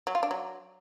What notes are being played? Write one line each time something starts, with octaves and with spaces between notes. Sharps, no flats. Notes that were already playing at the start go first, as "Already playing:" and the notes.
F#3
F4
D4
F#3